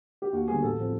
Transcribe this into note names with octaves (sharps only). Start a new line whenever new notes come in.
G4
D#2 F#4
D3 G3 B3 G#4
A1 A4
A2 F3 A3 C4